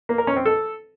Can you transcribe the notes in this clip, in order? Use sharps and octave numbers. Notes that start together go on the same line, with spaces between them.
A#3
A#4
C#4
C4
A4